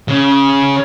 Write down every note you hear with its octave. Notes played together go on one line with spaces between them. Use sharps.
C#3